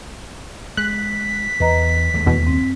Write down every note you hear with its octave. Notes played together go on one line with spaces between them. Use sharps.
G#3 F#6 B6
E2 B4 D#5 A#5
D#2 G#3 A3
E2 B2
F#2 C4